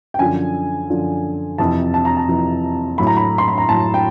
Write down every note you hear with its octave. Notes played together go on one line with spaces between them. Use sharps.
G5
F#2 D3 F3 G#5
F#2 D3 F3
F2 C3 E3 A5
A5
A#5
A5
F2 C3 E3
A2 F#3 B5
A#5
B5
C6
B5
A#5
A2 F#3 A5
G5